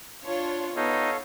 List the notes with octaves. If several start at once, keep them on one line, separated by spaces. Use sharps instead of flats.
D4 F4 C#5
B3 D#4 A4 C#5 F5